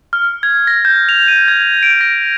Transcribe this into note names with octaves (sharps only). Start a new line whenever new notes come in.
F6
G#6
A#6
G6
F7
D#7
G#6
D7
A#6